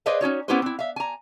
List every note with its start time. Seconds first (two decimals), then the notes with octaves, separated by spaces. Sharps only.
0.06 G#4 B4 C5 D5 D#5 F5
0.21 C#4 D#4 F#4 C#5
0.48 B3 C#4 E4 G4 B4 C5
0.62 C4 E4
0.79 E5 F5
0.96 G#5 A#5